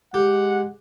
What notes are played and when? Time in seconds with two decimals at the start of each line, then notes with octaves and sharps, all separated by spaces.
0.14 G#3 G4 F#5